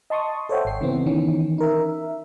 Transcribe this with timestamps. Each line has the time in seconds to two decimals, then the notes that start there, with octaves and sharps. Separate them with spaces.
0.10 D#5 A5 C6 C#6 D#6
0.49 A4 C5 C#5 E5 F#5 G5
0.65 G#1 G5 C7
0.81 C#3 E3 B3 C4
1.06 D#3 E3 B3 C#4
1.58 D#4 A#4 E5